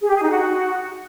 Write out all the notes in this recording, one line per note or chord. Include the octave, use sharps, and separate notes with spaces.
G#4
G4
G#4
D#4
F#4